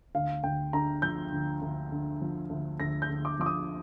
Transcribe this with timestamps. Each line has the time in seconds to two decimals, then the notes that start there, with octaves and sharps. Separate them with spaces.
0.15 D2 F5
0.43 D2 G5
0.73 D3 A#5
1.02 F3 G6
1.32 D2
1.62 D2
1.92 D3
2.21 F3
2.50 D2
2.80 D2 A#6
3.02 G6
3.10 D3
3.25 D6
3.39 F3 D6
3.46 D#6